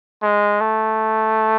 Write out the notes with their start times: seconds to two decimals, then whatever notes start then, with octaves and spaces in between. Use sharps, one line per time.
0.22 G#3
0.61 A3